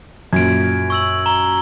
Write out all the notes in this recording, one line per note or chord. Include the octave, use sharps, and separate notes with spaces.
F#2 A#2 G#6 D7
C#6 E6 F#7
A#5 G7